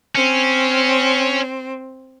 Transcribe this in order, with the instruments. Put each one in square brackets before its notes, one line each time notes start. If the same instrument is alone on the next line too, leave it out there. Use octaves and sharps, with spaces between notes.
[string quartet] C4 [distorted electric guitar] C#4